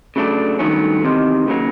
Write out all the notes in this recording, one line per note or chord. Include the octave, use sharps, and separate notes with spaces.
C#3 F#3 A3 D4
G2 D#3 F#3 A3 C#4
E2 C3 D#3
D#2 C#3 F#3 A#3